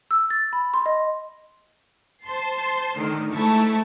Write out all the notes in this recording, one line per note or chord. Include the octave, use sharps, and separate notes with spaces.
E6
A6
B5
C6
D#5
C5 A5 C6 C7
A2 D3 D#3
G#2 A3 E4 A5 C#6